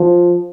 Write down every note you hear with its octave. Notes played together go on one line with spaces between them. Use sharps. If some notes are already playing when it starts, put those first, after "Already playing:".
Already playing: F3